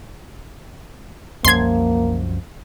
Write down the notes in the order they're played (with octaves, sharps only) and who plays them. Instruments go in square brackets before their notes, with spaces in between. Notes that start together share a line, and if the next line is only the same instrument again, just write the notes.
[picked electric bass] C2 F#2 F3 [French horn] A#3 [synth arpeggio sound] C6 G#6